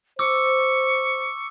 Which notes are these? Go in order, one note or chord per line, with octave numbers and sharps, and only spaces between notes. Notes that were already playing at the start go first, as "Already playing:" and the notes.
C5 C#6 D6 E6